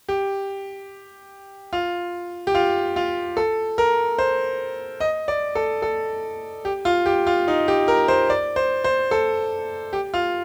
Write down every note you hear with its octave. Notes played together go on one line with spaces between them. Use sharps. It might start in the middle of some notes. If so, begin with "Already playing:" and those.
G4
F4
G4
F4
F4
A4
A#4
C5
D#5
D5
A4
A4
G4
F4
G4
F4
D#4
G4
A#4
C5
D5
C5
C5
A4
G4
F4